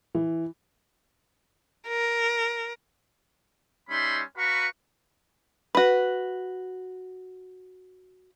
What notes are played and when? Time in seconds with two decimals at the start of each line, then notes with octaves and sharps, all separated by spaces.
0.15 E3
1.88 A#4
3.90 G3 C#4 D#4 E5 B5 C6
4.37 F#4 B4 F5 A#5 B5 C#6
5.75 F#4 B4